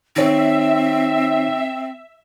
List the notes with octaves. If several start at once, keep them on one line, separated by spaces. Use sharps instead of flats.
D#3 C4 C#5 E5